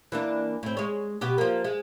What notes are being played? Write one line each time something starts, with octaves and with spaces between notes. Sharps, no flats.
E3 A#3 D4
A2 C4
G#3 C#5
B2 B3 G4
F3 A#3
G#3